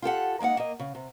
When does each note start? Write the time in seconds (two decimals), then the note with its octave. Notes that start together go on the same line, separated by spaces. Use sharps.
0.02 F4 G4 A4 F#5
0.40 G#3 A#3 D#4 F#5
0.57 A#3 D#5
0.79 C#3
0.95 C3